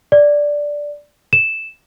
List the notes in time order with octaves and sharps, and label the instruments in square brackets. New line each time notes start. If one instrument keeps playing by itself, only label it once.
[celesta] D5
E7